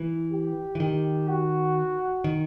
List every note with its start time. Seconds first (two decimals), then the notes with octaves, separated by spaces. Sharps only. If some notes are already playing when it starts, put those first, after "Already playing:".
Already playing: E3
0.32 G4
0.75 E3
0.80 D#3 G4
1.28 F#4
2.24 D#3